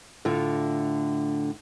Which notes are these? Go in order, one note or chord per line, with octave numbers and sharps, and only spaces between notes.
A2 D3 D4 F4